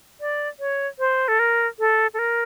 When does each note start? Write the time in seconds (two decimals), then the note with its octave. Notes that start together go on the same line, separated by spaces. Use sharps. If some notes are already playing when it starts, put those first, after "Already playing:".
0.21 D5
0.60 C#5
0.99 C5
1.28 A4
1.39 A#4
1.79 A4
2.14 A4
2.19 A#4